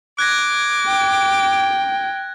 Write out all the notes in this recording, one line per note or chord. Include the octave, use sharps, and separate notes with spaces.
D6 F#6 G#6 A#6
G5